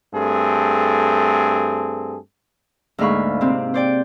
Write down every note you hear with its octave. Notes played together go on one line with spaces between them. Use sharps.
G2 A3 C4 G#4 A4
D2 G#2 A#3 F5 B5 C#6
C3 C4
C5 D5 G5